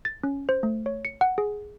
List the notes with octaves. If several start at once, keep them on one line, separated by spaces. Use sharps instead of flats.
A6
C#4
C5
A3
C#5
C#7
F#5
G#4